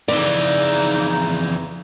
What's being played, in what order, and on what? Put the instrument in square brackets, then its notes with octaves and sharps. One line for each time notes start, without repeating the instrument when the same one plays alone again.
[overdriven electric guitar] F2 E3 [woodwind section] C#3 D#4 [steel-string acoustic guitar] D5